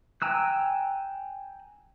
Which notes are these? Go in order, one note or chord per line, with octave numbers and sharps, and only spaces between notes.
G5 G#5 A#5 E6 F#6